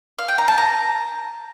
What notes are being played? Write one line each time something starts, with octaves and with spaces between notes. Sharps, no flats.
F5
G5
A#5
A5
A#5